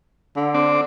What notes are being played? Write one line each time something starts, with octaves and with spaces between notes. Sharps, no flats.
D3
C4 D4 D5